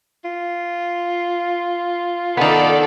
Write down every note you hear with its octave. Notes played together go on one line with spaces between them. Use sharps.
F4
D#3 B3 A4 D5